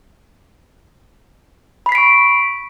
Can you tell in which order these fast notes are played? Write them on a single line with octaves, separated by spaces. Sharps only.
B5 C7 B6 D7 C#6